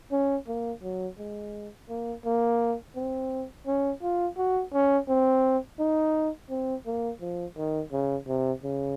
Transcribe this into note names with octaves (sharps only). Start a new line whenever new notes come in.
C#4
A#3
F#3
G#3
A#3
A#3
C4
C#4
F4
F#4
C#4
C4
D#4
C4
A#3
F3
D#3
C#3
C3
C#3